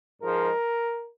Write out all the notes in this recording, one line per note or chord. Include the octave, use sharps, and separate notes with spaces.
G#2 F3 G#3 A#4